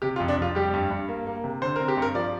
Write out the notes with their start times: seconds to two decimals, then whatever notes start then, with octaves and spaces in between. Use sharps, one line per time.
0.02 C3 G4
0.16 F4
0.20 F2
0.28 D4
0.37 F2 F4
0.55 G3 G4
0.74 G2
0.90 G2
1.08 A#3
1.27 A#3
1.44 C3
1.62 D3 C5
1.76 C4 A#4
1.88 G4
1.97 G2
2.02 A#4
2.15 F3 D5